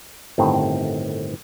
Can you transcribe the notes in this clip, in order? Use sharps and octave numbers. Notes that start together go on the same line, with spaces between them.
G1 A2 D#3 C4